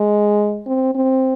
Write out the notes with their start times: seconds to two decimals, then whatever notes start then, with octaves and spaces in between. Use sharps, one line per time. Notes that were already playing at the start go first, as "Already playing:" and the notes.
Already playing: G#3
0.66 C4
0.95 C4